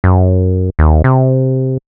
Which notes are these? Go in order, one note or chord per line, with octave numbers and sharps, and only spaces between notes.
F#2
D#2
C3